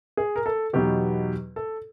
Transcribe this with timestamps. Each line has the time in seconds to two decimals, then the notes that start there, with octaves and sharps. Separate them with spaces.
0.17 G#4
0.36 A#4
0.46 A4
0.73 E2 B2 F#3 B3 D#4 G4
1.56 A4